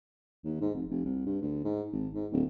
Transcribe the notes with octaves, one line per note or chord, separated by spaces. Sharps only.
D#2
G#2
F1
F1
C2
G2
D2
G#2
G#1
G#2
D1